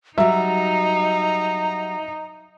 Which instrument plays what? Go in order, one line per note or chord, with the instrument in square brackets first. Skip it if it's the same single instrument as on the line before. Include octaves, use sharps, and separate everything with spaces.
[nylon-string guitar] F#3 G3 [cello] D#4 [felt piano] E5 [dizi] A#5